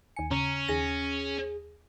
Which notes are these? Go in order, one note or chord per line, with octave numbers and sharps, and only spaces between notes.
D#2 G#5 C#7
C#3 C#4 A#5
D#2 G#4 G#5 A#6